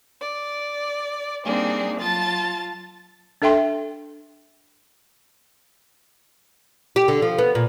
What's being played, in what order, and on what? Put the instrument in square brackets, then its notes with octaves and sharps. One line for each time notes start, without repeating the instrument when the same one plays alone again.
[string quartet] D5
G3 A#3 C4 D4 D#4 G#4
F#3 F4 A5 A6
[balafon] D4 A4 E5 G5 C6
[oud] G4
D3
F3
B3
A#2